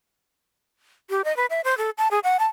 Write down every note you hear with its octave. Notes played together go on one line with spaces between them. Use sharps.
G4
D#5
B4
E5
C5
A4
A5
G#4
F#5
A5